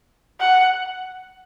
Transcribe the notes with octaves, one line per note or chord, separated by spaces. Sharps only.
F#5